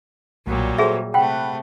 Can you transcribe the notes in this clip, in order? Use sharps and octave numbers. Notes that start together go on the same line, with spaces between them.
B1 A#2 F#3 G3
F#4 G#4 A4 C5 E5
C3 A3 F#5 G5 B5 F#6